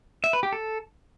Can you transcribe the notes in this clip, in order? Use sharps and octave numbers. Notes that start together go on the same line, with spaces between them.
E5
B4
G4
A4